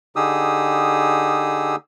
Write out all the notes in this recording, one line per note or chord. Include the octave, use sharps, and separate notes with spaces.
D3 D#4 G4 G#4 D#6 E6